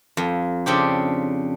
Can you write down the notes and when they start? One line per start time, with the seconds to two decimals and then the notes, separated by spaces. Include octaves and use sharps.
0.17 F2
0.66 C#3 C4 D4 G4